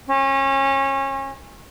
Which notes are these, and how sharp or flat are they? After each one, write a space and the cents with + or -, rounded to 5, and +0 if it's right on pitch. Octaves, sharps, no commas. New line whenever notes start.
C#4 -30